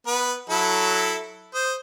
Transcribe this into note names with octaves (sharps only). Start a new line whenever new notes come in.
B3 B4
F#3 E4 A4
C5 D#6